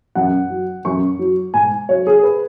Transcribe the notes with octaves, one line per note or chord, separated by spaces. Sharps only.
F#2 F#5
F#3
F#2 C#6
F#3
G#2 G#5
F#3 C#5
G#4
B4